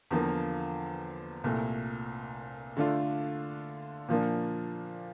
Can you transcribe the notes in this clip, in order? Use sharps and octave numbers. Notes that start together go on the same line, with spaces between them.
E2 D3 F3 A#3
C2 A#2 A3
D3 A3 D4 F4
A#2 F3 A#3 D4